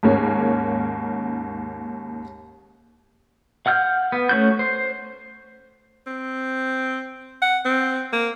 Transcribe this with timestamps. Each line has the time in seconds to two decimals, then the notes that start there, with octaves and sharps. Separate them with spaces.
0.03 D#2 G#2 A#3 C#4
3.66 F5 F#5 F6 G6
4.12 B3
4.29 A3 C#4 F#4 G6
4.59 C5
6.07 C4
7.42 F#5
7.65 C4
8.13 A#3